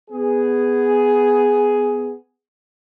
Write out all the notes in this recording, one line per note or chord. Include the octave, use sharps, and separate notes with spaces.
B3 G#4